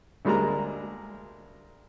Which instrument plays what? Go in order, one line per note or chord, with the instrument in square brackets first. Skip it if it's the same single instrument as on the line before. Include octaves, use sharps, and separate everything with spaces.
[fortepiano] D2 G3 G#3 A#3 A#5